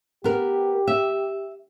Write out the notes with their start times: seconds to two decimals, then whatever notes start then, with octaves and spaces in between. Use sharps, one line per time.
0.24 B3 G4 A#4
0.87 E5